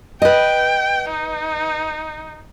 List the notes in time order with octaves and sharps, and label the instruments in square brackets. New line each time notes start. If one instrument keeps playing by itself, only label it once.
[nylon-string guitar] B4 D#5 [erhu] G5
[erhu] D#4